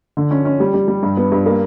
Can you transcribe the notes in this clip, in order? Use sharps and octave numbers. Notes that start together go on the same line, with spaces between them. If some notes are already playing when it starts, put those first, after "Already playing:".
D3
C#4
C#4
G3
G3
G3
G2
B3
G2
A#3